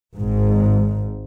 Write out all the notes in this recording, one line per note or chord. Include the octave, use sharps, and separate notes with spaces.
G#1 G#2